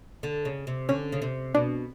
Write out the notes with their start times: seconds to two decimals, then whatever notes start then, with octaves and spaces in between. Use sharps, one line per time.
0.23 D3
0.45 C#3
0.67 C3
0.89 D3 C#4
1.12 C#3
1.22 C3
1.54 B2 D4